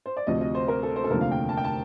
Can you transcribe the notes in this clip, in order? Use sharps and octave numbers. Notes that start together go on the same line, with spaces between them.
C5
D5
D2 C3 F3 D#5
D#5
C5
A#4
A4
C5
A4
F1 D#2 D3 F3 C4 A#4
F5
G5
A5
G5
A5